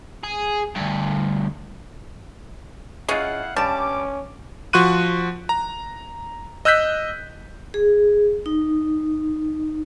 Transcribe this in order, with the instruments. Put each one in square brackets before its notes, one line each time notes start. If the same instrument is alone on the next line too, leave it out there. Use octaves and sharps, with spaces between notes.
[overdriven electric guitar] G#4
D2 G2
[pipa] G#3 C#4 [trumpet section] E4 F5 F#5 [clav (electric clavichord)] F4 G#4
[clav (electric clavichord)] G2 G3 [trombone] C#4 [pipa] A5 [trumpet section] D6
[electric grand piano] F3 F#4 C6 C#6 F#6 D#7
A#5
D#5 E6 F#6 G6 B6
[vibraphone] G#4
D#4